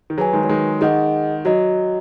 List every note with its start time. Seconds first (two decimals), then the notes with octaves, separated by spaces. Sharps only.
0.10 D#3
0.18 F#3 G#4 B4 G#5
0.33 D#3 G#3
0.43 F#3
0.49 D#3 G#3
0.81 D#3 G#4 D#5 F#5
1.45 F#3 F#4 D#5